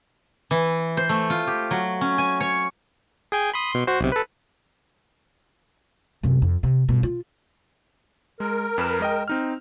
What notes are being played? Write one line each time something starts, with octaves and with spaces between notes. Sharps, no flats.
E3
C5
A3
F4
G4
F#3
C#4
G#5
C#5
G#4 G5 G#5
B5 C6 D#6
B2 C6
F#4 C5
B1 C3
A4 B4
F#2 C3
F2
C3
G2 B2
F4
G#3 A#4
F2 B4 E7
G#3 D#5 G5
C4 D#4 F6